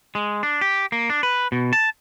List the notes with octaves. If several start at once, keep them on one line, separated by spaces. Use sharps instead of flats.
G#3
D4
G4
A#3
D4
B4
B2
A5